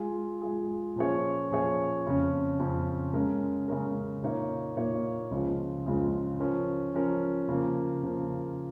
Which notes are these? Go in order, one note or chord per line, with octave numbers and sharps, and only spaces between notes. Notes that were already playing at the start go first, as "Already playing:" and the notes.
Already playing: G#3 F4 G#4
G#3 F4 G#4
A#2 F3 C#4 G#4 C#5
A#2 F3 C#4 G#4 C#5
F2 C#3 F3 C#4
F2 C#3 F3 C#4
C#3 G#3 C#4 A#4
C#3 G#3 C#4 A#4
A#2 A#3 D#4 C#5 F5
A#2 A#3 D#4 C#5 F5
C#2 C#3 F3 G#3 F4
C#2 C#3 F3 G#3 F4
F3 C#4 A#4
F3 C#4 A#4
C#3 F3 A#3
C#3 F3 A#3